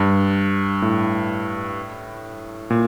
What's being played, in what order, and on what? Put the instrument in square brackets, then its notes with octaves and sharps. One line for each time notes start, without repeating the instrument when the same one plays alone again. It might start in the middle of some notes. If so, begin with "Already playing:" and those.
Already playing: [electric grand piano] G2
A2
A#2